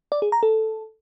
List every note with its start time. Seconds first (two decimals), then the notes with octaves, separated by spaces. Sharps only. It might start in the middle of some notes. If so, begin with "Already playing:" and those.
0.12 D5
0.22 G#4
0.32 A#5
0.43 A4